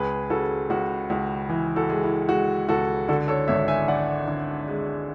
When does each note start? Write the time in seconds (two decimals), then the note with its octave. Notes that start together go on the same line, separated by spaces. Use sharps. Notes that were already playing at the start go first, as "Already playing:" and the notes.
Already playing: C#2 G#4 B4
0.30 C#3 F#4 A4
0.70 C#2 F#4
1.10 C#2 F#4
1.49 E3
1.76 F#4 A4
1.90 G#3
2.03 E4
2.29 G#3 F#4
2.69 C#2 F#4 A4
3.08 D3 F#4 A4
3.28 A4 C#5
3.48 G#1 C#5 E5
3.68 E5 G#5
3.88 D3 D5 F#5
4.28 D3
4.68 G#3